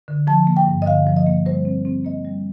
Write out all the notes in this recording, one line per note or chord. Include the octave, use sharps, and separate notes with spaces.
D3
F3 A5
A#3
G5
G2
D#5
D3 F5
F3
D#5
A#3
G3 C5
C4
C4
A#3 D#5
G3